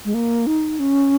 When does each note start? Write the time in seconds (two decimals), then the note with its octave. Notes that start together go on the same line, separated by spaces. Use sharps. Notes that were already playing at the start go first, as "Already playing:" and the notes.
0.05 G#3
0.14 A#3
0.47 D#4
0.79 C#4